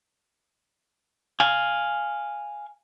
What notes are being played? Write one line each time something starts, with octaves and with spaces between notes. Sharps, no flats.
F5 G#5